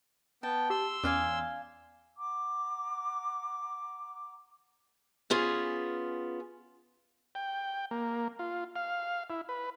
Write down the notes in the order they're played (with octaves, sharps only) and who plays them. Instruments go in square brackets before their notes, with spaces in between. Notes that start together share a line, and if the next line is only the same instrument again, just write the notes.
[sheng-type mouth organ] B3 G5 [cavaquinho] A5
[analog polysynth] G4 [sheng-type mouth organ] C6 E6
[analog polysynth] E2 B3 C#4 [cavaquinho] D5 F5 G#5
[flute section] F#5 A#5 D6
[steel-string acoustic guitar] B3 C#4 F4 G#4
[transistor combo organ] G5
A#3
F4
F5
E4
B4